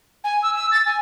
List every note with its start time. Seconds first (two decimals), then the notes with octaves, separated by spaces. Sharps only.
0.24 G#5
0.43 E6
0.55 E6
0.72 A6
0.86 G#5